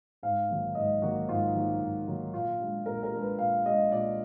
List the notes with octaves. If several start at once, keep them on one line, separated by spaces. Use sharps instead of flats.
G#2 F5
D#3 F#3 A#3
G#2 D#5
D#3 F#3 A#3 F#4
G#2 F4
D#3 F#3 A#3
G#2
D#3 F#3 A#3
A#2 F4
G#3 D4
A#2 A#4
A#4
G#3 D4
B4
A#2 F5
G#3 D4 D#5
A#2 D5